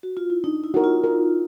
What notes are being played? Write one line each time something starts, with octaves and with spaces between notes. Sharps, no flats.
F#4
F4
E4
D4 D#4
E4
F#4 A#4
F4
A#4